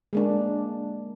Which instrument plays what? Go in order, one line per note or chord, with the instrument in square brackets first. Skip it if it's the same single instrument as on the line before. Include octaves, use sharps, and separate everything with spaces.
[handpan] G#3 A#3 D4